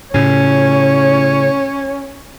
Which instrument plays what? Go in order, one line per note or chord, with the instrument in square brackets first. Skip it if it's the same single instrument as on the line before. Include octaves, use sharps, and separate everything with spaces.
[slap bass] A2 C#3 [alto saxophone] C#4 [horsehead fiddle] C#5